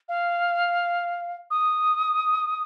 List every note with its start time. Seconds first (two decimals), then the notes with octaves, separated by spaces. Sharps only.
0.08 F5
1.50 D#6